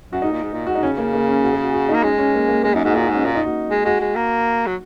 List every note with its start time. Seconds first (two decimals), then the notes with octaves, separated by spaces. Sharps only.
0.12 F#2 F#4
0.22 G#2 D#4
0.32 A#2
0.42 G#2
0.53 A#2
0.67 G#2 F#4
0.75 D#4
0.83 C#3 C#4
0.98 A#3
1.13 A#3
1.28 C#4
1.43 F#4
1.53 G#4
1.63 F#4
1.74 F#4
1.89 D#4
1.94 A#3
2.03 G#3 C#4
2.19 C#4
2.34 A#3
2.49 A#3
2.64 G#3 A#3
2.74 F#2 D#4
2.84 G#2 F#4
2.94 A#2 G#4
3.05 F#4
3.09 G#2
3.14 C#4
3.25 A#2 A#3
3.35 D#4
3.45 F#4
3.70 G#3
3.85 G#3 F#4
4.01 G#3
4.15 A#3
4.66 F#3